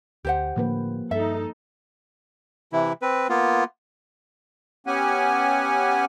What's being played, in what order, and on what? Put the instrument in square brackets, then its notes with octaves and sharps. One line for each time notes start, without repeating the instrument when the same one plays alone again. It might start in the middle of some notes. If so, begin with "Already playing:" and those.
[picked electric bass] D2 [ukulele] G4 C5 F#5
[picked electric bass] A2 D3 [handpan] F3 A#3 B4
[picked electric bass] G2 [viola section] D#4 A4 [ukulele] E5
[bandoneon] C3 E3 E4
C4 B4
A#3 B3 F4
[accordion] B3 C#4 G4 F#5 G#5